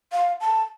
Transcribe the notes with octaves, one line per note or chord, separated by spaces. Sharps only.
F5
A5